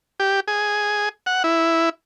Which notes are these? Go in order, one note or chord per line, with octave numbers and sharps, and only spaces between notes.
G4
G#4
F#5
E4